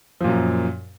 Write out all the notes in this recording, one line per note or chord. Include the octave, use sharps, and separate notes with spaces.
F#2 A#2 F3